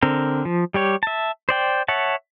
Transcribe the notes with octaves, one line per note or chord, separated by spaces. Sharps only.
D3 C4 A#4
F3
G3 G4 C#5
E5 A5
C5 D5 G5
C#5 E5 F#5 A5